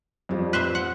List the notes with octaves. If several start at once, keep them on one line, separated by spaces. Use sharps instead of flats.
F2 F3 G3
B4 C5 E5
F#5